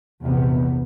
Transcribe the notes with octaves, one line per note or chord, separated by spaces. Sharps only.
A#1 E2 C3 B3